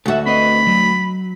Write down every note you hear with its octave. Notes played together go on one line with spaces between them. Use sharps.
D2 F#4 A4 E5
C4 B4 D#5 B5
F#3